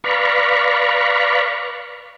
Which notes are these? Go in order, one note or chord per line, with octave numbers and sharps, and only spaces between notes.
B4 D5 F5 A#5 B5 C#6